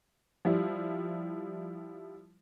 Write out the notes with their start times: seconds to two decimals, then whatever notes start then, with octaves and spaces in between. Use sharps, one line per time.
0.45 F3 G3 E4